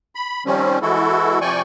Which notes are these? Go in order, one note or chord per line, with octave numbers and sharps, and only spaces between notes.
B5
D#3 F3 G3 C4 C#4
E3 G#3 E4 F#4 A4
C3 F3 D5 G5 G#5 C#6